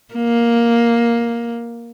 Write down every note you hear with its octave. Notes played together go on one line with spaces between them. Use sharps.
A#3